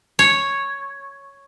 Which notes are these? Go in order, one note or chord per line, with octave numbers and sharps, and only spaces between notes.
C#5